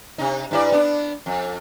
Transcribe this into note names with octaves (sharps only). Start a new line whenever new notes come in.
C3 D#4
G2 E4 D5
B3 D4
F2